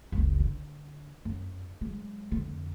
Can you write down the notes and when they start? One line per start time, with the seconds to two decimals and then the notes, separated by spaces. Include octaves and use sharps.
0.12 F#1 C#2
0.40 D3
1.25 F#2
1.81 F#3 G#3
2.32 F2 D3